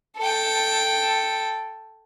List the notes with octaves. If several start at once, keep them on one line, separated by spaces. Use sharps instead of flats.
A4 G5